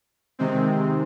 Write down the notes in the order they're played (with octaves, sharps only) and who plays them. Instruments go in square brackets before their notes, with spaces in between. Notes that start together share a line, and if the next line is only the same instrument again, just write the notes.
[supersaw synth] C3 D#3 G#3 C4